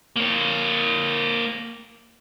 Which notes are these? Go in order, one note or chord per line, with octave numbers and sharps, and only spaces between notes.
A#3 C#5